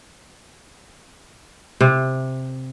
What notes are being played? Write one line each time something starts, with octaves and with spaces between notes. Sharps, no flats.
C3